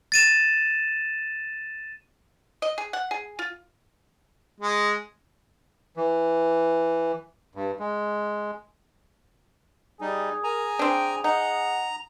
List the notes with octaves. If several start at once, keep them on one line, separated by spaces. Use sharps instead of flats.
A6 D#7 E7
D#5
G#4
F#5
G#4
F4
G#3
E3
G2
G#3
G3 D#4 G#4
A#4 G#5 A#5
C4 D4 G5
D#4 F#5 A#5